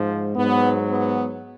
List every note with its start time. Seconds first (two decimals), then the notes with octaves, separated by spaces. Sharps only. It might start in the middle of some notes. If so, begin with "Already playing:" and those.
Already playing: G#2 F3
0.35 G#2 F#3 B3
0.88 B3